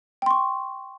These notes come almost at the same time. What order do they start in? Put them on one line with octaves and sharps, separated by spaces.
G5 C6 C#6